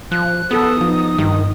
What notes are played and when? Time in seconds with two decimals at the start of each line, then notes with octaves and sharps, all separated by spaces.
0.11 F3 F#6
0.51 B3 A4 D#6
0.81 F3 D#4
1.18 G2 D#3